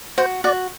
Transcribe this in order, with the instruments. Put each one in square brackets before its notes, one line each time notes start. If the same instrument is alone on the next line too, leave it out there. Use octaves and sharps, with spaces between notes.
[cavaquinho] F#4 [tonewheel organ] C5
[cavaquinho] F#4 [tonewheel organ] D5